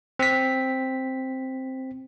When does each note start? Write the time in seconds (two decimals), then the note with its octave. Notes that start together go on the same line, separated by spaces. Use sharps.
0.19 C4 B6